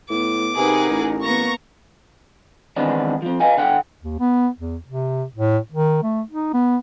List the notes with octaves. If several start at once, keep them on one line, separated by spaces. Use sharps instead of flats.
A2 B3 D6
C3 D#4 G#4 A#4 B4 F#5
A1
A#3 B3 A#5 C#6
D#3 E3 G#3 B3 C4 D4
F3 C4
B4 D#5 F5 G#5
D3 F#5 G5
D#2
B3
E2
C3
A2
D#3
A3
D#4
B3